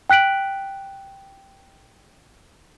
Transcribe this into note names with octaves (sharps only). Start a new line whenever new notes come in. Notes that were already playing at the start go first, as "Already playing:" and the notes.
G5 F#6 B6 D7 F#7